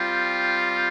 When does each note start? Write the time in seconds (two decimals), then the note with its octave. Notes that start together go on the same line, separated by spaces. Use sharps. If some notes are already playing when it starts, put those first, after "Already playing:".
Already playing: G3 C4 F4